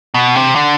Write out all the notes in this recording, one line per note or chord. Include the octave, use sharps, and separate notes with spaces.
B2
C3
D3